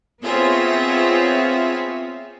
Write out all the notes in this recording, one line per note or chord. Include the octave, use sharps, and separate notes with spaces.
B3 C4 F4 G#4 C#5 E5